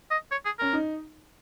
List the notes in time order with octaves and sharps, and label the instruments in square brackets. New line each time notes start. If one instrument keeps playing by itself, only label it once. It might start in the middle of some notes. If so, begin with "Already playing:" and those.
[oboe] D#5
C#5
G#4
[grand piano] C#4 [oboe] A#4
[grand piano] D#4